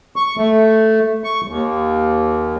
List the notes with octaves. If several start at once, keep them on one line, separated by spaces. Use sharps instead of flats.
C#6
A3
C#6
D#2